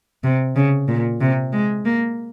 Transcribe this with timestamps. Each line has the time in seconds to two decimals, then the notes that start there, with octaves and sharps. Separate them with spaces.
0.24 C3
0.56 C#3
0.88 A#2
1.21 C3
1.53 G#3
1.86 A#3